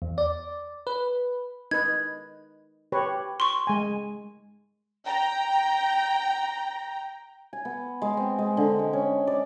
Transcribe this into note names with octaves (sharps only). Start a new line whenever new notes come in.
E2
D5
B4
D#4 B4 G#6
G4 B4 C#5
C6 C#6
G#3 G#5
G5 A#5
G#5
B3
G#3
C4
G#3
D3
G#3
C#4
D5